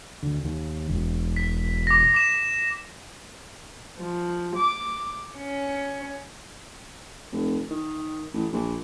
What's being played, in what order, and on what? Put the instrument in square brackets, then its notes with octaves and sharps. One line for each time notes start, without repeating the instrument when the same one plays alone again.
[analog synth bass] D2
D#2
E1
[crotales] B6
D6 A#6
D6 E7
[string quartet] F3
D6
C#4
[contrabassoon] F1
D#3
A1
A#1